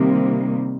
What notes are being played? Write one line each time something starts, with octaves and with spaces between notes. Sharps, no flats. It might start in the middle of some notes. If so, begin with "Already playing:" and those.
Already playing: C3 D#3 G3 A#3